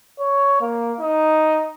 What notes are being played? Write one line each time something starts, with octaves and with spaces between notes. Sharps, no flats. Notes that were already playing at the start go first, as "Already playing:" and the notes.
C#5
A#3
D#4